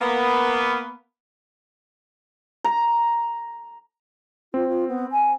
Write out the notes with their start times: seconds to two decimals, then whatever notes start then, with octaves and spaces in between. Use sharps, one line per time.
0.01 A#3 B3
2.64 A#5
4.54 C4 F4
4.68 F4
4.88 B3
5.11 G#5